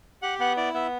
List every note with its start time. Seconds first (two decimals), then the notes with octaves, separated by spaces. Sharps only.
0.22 G4 F#5
0.39 B3 F#5
0.57 E4 D5
0.74 B3 E5